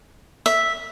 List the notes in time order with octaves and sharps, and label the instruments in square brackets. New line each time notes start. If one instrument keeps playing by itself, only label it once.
[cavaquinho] E5